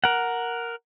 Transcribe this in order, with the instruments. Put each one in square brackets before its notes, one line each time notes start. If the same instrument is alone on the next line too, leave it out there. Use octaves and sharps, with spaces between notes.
[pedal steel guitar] A#4 F#5